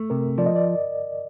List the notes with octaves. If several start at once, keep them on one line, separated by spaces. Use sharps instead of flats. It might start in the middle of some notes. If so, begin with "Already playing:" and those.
Already playing: A3
C3 A#4
F3 D5
D#5
D5